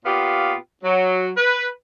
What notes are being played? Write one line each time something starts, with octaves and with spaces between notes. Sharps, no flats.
A#2 B3 F4 G4 F5
F#3
B4